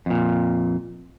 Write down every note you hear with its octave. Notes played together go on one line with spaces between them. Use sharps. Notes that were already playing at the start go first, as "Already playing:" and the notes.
F2 A#2